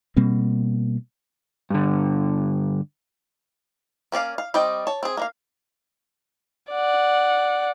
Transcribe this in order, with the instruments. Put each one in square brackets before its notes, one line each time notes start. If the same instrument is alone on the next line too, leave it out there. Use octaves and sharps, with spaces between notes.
[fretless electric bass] B2 G3 A#3 C4
[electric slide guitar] G2 D3
[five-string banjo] A#3 C#4 D5 F5
F5
G3 C4 D5 D#5 G5
C#5 A5
C4 G#4
A#3 D4 F5
[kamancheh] D5 F#5